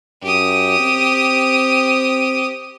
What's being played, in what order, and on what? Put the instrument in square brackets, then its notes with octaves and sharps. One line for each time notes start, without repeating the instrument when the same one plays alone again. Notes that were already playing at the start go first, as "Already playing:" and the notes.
[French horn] F#2 [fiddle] G4 D#6
[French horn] C4